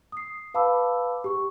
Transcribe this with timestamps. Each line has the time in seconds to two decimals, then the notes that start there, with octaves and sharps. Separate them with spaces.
0.12 D#6 C7
0.54 B4 F5 A5 B5 D6 E6
1.24 G4 C#6